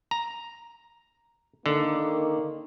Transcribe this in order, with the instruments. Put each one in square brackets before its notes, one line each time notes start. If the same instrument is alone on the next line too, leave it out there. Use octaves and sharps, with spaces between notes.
[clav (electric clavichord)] A#5
[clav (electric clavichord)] D3 [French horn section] D#3 A#3 D#4